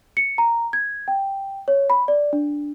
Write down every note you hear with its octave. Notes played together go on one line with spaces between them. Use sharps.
C#7
A#5
G#6
G5
C#5
B5
D5
D4